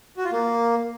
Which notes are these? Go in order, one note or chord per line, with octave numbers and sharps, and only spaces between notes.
F#4
F4
A#3